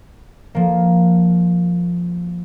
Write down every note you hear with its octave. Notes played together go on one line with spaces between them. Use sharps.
F3 A#3